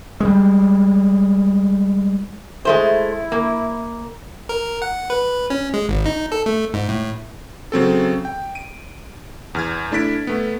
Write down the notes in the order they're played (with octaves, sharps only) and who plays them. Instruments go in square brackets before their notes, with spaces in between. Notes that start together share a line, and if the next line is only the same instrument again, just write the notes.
[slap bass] G3 G#3
[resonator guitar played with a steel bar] G#3 A3 C5 [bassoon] E4
[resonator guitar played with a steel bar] A#3
[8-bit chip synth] A#4
F#5
B4
C#4
G#3
G#1
D#4
A4
A3
G#2
A2
[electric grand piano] C#3 F#3 C4 A4
G5
D7 D#7
E2 F6 G#6
A3 D4 E4 A6 B6 D7
A3 B3